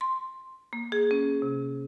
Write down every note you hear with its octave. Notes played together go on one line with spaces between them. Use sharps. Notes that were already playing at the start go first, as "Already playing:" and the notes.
C6
A#3
G#4
C#4
C3